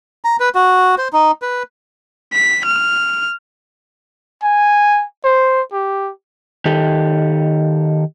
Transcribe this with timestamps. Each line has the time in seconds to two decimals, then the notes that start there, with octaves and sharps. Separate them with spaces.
0.25 A#5
0.40 B4
0.55 F#4
0.98 C5
1.13 D#4
1.42 B4
2.33 B6
2.65 F6
4.43 G#5
5.25 C5
5.73 G4
6.65 D#3 G4 A4